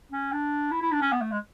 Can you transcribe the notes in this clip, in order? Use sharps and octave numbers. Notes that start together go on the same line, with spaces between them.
C#4
D4
E4
E4
D4
C#4
B3
A3
G#3